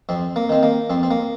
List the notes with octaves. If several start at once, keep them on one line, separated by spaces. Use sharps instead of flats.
F2 C4
A#3
D#3 C4
A#3
F2 C4
C4
A#3